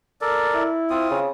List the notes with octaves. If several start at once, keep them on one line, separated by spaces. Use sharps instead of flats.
A4 A#4 D5
E4
C4 F4 D#6
C#3